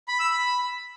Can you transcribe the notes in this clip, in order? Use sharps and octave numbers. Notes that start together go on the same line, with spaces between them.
B5
E6
B5